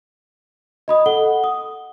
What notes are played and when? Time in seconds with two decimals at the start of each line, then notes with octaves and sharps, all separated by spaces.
0.88 D#5 B5 D#6
1.06 A4 F#5 G7
1.44 D#6